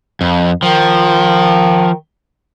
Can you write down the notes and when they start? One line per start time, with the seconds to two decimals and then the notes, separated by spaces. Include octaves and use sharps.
0.21 F2
0.63 D#3 F3